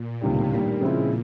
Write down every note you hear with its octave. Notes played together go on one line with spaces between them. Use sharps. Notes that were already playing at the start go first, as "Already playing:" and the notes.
Already playing: A#2
C#2 A2 C3 D#3 G3
G2 A#2 D#3 G3 A#3
A#2 C#3 F3 G#3 C4 E4